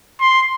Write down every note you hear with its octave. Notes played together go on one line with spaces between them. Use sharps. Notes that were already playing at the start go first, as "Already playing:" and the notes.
C6